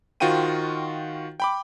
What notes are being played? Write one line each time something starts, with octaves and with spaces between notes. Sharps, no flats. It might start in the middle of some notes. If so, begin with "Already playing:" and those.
D#3 F4 F#4 C5 G5 D#7
G5 B5 D6